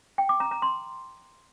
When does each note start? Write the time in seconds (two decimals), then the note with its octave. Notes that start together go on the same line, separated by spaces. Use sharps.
0.18 G5
0.29 D6
0.40 A#5
0.51 A#5
0.62 C6